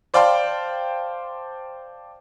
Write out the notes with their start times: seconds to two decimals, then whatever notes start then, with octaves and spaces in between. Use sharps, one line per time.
0.14 C5 D5 F5 G5 A5 C6